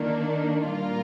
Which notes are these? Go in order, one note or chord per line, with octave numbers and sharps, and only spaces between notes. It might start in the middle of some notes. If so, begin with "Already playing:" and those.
Already playing: D#3 A#3 D4
A#2 G3 A#3 F4 A#4